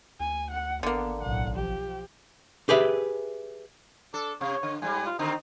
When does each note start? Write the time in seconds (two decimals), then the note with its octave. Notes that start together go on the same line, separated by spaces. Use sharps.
0.20 D2 G#5
0.51 F#5
0.83 G#1 D3 A#3 B3
1.22 B1 A2 F#5
1.56 F3 G4
2.69 G4 G#4 B4 E5
4.14 D4 A4
4.41 C3 C#5
4.63 D3
4.82 G#2 G3 G#5
5.06 F4
5.19 D3 D#3 C4 D#4